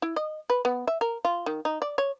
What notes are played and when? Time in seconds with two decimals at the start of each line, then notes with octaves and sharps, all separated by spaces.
0.02 E4
0.16 D#5
0.50 B4
0.65 B3
0.87 E5
1.01 A#4
1.25 F4
1.46 D#3
1.65 D#4
1.82 D5
1.98 C#5